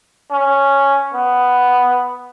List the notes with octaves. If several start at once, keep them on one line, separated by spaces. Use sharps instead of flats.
C#4
B3